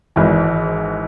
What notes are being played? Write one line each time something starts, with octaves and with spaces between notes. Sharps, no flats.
G#1 G#2 E3